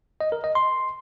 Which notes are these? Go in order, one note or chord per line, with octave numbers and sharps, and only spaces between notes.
D#5
A#4
D#5
C6